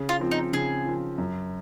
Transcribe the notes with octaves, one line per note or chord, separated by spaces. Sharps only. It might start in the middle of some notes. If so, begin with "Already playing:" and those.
Already playing: C#3
F4
F3 C4
D#4
C#3 G#4
F3 C4
F#2